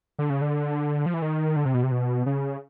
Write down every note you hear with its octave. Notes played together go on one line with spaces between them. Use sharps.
D3
C#3
D3
F3
E3
D#3
D3
C3
B2
C3
B2
C#3